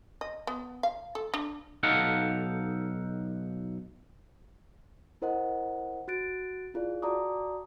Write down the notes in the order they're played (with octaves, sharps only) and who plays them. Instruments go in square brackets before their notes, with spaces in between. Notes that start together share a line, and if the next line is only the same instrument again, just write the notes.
[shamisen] D#5
B3
F5
A4
D4
[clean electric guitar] B1 D#4 A4 F5 F#5
[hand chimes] E4 A#4 C5 D#5 F#5
F#4 F#6 A6 D7
E4 F4 G#4 D5
F#4 D5 A5 A#5 D6 D#6